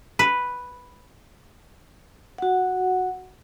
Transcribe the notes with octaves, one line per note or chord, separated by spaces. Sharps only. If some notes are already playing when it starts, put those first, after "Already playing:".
B4
F#4 F#5